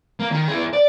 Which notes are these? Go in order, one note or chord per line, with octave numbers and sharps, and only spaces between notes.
A#3
D#3
E4 G#4
D5